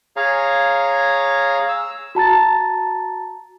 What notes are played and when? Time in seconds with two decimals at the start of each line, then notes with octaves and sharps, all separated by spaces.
0.17 G#4 C#5 F5 A#5
1.69 E6
2.15 F#4 A5 A#5 A6